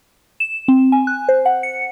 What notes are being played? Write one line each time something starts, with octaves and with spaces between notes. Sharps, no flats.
E7
C4
G#5
F#6
C5
F#5
C#7